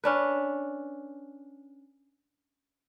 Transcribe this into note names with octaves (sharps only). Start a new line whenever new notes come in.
C#4 D4 B4